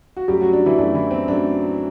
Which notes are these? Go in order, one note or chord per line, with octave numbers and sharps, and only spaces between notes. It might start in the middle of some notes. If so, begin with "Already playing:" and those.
F#4
F#2 F#3 G3 A3 G4
F#3 F#4
D4
E3 E4
F#2 F#3 A3 D4
E3 E4
C4
F#2 F#3 A3 D4